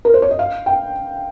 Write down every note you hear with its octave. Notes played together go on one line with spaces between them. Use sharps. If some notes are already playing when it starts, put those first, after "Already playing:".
A#4
C5
C#5
D#5
F5
G5